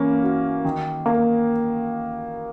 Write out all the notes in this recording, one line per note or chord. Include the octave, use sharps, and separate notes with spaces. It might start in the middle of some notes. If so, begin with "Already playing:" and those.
Already playing: E3 A#3 C#4
F#4
D#3
A#3